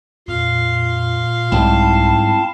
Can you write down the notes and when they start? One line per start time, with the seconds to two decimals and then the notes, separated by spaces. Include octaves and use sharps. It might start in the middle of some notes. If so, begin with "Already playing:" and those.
0.28 F2 A#2 F5 C6
1.52 C2 G#2 G3 C4 E4 A5